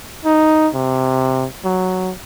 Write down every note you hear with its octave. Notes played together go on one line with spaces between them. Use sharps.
D#4
C3
F#3